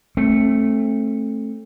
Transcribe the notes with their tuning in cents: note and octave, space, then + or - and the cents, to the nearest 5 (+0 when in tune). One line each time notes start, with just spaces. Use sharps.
A3 +0 C4 +35